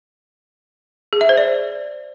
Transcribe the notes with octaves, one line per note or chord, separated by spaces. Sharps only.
G#4
E5
C5
D5